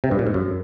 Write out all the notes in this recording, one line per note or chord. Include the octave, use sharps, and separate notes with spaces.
C3
G2
A#2
G#2
F#2